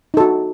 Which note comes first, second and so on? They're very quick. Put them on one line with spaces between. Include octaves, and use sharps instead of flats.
D#4 A4 F#4